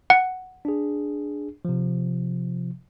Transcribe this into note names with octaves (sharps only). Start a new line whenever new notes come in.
F#5
D4 G#4
C3 F3